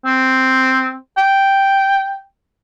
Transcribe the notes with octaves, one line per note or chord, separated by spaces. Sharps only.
C4
G5